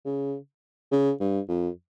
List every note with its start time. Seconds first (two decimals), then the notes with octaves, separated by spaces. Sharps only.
0.05 C#3
0.91 C#3
1.20 G2
1.49 F2